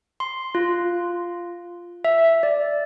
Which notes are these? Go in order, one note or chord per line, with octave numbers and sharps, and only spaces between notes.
C6
F4
E5
D5